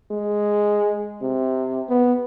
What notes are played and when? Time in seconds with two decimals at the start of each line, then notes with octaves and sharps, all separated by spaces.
0.11 G#3
1.22 C3
1.89 B3